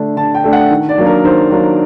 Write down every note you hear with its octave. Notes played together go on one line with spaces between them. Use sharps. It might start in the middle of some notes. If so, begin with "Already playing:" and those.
Already playing: D3 A3 D4
D3 A5
G5
A3 D4
F#5
D#3
D5
F#3 A#3 D4
A#4
D#3 C5
F#3 A#3 D4